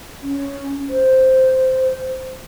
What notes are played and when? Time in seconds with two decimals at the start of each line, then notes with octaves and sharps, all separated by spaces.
0.22 C#4
0.89 C5